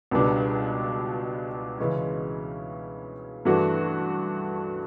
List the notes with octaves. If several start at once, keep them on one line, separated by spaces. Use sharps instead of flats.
C#2 B2 G3 B3 D4
C#3 E3 G#3 C#4
G2 E3 A3 D4 F#4